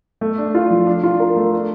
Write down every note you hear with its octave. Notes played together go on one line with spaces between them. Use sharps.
A3
D4
F4
F3
D4
F4
A#4
A3
D4